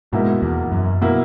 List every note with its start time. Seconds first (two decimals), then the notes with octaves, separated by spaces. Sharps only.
0.12 G#2 B2 A#3 E4
0.42 E2
0.72 F#2
1.01 B2 A#3 E4